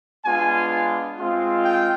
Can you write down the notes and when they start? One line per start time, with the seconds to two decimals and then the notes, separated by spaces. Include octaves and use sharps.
0.24 G#3 B3 D4 F4 G#5
1.17 G#3 C4 F4
1.63 G5